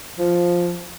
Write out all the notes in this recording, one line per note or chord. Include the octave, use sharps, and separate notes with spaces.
F3